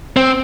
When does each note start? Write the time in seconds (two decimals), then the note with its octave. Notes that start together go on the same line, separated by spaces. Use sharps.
0.16 C4